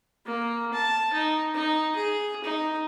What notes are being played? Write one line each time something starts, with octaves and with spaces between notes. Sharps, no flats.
A#3
A5
D#4
D#4
G#4
D#4